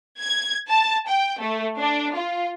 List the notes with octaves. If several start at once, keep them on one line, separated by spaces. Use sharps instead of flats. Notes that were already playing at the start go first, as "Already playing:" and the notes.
G#6
A5
G5
A3
D4
F4